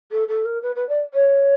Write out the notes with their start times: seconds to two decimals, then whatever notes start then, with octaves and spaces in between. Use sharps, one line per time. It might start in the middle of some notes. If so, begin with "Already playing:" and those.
0.11 A4
0.28 A4
0.45 A#4
0.62 B4
0.75 B4
0.89 D5
1.14 C#5